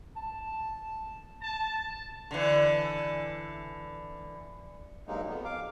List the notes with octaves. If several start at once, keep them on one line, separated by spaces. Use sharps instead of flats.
A5
A5
D3 E3
G2 F#3 G#3 A#3 D#4
F2 B3
F5 D6